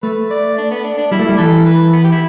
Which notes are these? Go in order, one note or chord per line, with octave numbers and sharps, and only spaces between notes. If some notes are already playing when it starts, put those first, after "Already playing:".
A3 B4
D5
D4
B3
D4
D4
G3 E4
A3
G3
E3 A4
B4
B3
G4
E4